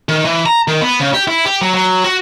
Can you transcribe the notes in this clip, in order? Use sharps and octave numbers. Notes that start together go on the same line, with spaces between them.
D#3
E3
A#5
D#3
B3
C#3
G4
E4
G4
F#3
F#3
F#4